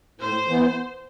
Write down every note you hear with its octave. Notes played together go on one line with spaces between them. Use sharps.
A2 C5
E3 B3